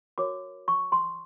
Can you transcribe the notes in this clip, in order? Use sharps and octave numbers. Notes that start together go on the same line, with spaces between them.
F#4 A#4 C#5 D6
C#6
C6